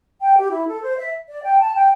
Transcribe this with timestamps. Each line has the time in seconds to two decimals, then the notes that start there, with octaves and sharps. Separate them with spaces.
0.21 G5
0.37 G4
0.51 E4
0.67 A4
0.83 C5
0.98 E5
1.28 D5
1.44 G5
1.60 A5
1.75 G5